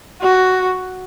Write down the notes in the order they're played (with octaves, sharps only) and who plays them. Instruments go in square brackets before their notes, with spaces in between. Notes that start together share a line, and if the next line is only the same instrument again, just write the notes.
[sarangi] F#4